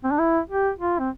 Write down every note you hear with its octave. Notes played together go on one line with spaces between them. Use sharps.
C4
D4
E4
G4
F4
C4